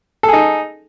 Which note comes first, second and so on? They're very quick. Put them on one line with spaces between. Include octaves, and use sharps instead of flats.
A4 G#4 D#4